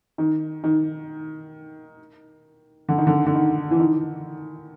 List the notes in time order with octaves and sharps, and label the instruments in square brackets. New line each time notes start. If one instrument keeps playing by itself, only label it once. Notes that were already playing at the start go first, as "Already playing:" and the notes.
[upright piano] D#3
D#3
D3
D#3
D3
D3
D#3
E3
D#3